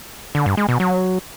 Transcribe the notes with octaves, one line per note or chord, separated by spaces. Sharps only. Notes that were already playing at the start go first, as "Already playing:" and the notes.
D3
G2
G#3
B2
F#3